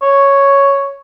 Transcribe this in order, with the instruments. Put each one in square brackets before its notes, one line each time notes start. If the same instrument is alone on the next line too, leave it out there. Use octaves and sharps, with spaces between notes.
[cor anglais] C#5